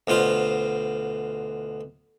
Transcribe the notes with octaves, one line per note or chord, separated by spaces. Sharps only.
D2 B2 F4 C5